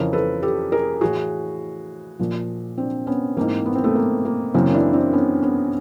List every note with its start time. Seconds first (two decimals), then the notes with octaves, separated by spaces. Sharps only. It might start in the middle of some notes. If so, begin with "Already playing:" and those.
Already playing: F2 C#3 E3 A#4 C5
0.13 A4 B4
0.42 G4 A4
0.72 G#4 A#4
1.01 A2 E3 F#4 G#4
2.19 A#2 F3
2.78 C4 D4
3.07 B3 C#4
3.37 G#2 E3 A#3 C4
3.66 B3
3.75 C4
3.84 A3 B3
3.95 A#3
4.25 A#3
4.54 F#2 C#3 E3 A#3 C4
4.74 D4 E4
4.93 C4 D4
5.13 B3 C#4
5.42 B3 C#4